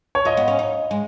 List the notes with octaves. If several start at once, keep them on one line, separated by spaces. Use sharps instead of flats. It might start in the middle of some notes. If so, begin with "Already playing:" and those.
C#5
F4 D#5
B3
C#4
D#4
G#3